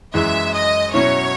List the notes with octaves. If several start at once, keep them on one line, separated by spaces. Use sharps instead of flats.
F#2 E3 G#3 E5
D#5
B2 F#3 C#4 E4 C#5